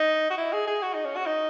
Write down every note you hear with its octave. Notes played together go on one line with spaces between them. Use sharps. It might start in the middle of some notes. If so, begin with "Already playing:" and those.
Already playing: D#4
F#4
E4
G#4
G#4
F#4
D#4
C#4
F#4
D#4